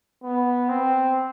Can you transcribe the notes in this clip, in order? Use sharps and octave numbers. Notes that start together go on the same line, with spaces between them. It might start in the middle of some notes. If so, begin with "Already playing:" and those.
B3
C4